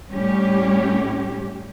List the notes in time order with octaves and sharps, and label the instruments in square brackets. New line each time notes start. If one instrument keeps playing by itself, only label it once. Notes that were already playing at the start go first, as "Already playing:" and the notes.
[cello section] A2 G3 C#4 G4